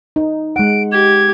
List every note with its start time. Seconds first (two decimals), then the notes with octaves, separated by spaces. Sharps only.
0.16 D#4
0.56 G#3 F#5 D7
0.92 G4 G#6